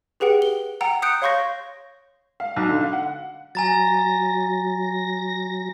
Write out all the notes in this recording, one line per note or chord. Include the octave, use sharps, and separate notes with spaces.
G4 G#4 B4 F#5 G5
G7
F#5 G5 A#5
D#6 F#6 G6 C#7 D7
C#5 F5 C6 C#6 G6 A#6
F5
B1
D3
F5
F#5
F#3 G#5 A#5 A6 A#6